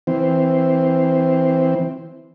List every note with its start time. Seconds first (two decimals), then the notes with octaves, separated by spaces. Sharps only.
0.07 E3 C4